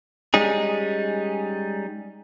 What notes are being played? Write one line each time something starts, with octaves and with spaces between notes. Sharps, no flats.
G3 G#3 C#4 D#4 G#4